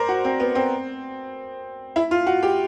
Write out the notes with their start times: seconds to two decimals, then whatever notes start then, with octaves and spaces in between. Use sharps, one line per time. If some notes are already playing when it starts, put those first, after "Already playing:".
Already playing: A#4 C5 D5
0.09 F#4
0.25 C4
0.40 B3
0.55 C4
1.96 E4
2.11 F4
2.26 F#4
2.43 G4